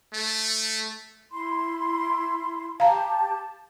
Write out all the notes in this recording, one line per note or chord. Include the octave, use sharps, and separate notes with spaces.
A3
E4 B5 C6
G4 F5 A5 A#5